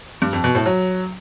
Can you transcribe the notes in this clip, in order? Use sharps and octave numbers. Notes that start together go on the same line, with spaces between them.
G2
F2
B2
A2
F#3